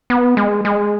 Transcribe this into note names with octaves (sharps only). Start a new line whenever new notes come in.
B3
G#3
G#3